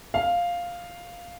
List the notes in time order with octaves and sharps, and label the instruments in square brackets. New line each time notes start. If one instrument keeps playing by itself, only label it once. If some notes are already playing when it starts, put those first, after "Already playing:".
[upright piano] F5